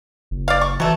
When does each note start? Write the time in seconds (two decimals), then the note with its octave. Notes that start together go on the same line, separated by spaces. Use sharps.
0.31 F#1
0.48 D5 F5
0.61 C#6
0.80 E3 F#3 A3